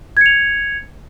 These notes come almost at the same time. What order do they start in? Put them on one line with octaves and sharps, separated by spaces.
G#6 C#7 F7